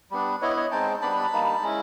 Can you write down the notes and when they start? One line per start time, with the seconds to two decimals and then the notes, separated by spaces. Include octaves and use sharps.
0.11 G3 B3 D4
0.41 B3 E4 C#5 D#5
0.57 C#5 D#5
0.72 G#3 C4 D#4 G5 A5
1.01 G3 B3 D4 A5 B5
1.33 G3 A#3 D#4
1.62 G#3 C#4 E4